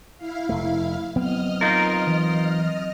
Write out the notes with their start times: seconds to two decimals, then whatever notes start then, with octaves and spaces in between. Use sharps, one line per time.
0.17 E4 F5
0.49 F1 A3
1.16 F#3 B3 C4 D#5 F6
1.61 D#4 F4 A#4
2.07 E3